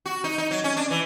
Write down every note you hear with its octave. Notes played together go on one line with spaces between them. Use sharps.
F#4
D#4
D#4
F#3
C#4
D4
E3